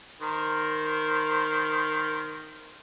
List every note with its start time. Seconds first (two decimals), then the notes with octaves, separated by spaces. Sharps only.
0.21 D#3 A#4 C5